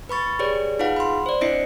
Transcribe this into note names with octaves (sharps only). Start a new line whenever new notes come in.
B4 B5 C#6 A6
G4 G#4 B4 C#5 D5
D#4 F4 G#4 B4 F5 F#5
B5 C6
C5 D5
C4 D4 E4 D#5 C7 C#7